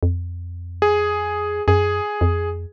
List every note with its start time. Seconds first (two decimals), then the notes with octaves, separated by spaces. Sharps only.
0.03 F2
0.82 G#4
1.68 F#2 G#4
2.21 F2